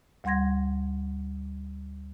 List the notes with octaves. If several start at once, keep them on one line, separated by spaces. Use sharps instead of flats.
D2 G3 F#5 C6 G#6 A#6